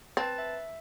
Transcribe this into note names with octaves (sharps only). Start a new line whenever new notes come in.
C4 B4 A5 A6
E5